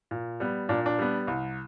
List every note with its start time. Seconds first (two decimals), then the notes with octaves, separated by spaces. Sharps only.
0.11 A#2
0.40 G3 B3
0.69 A#2 D4
0.86 D4
0.99 G3 B3
1.27 C2